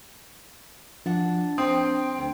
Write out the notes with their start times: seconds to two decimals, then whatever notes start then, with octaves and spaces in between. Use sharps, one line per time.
1.06 F3 D4 F#5
1.58 C4 G5 D#6
2.18 D2